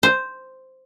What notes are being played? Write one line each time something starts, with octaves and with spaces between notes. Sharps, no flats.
C5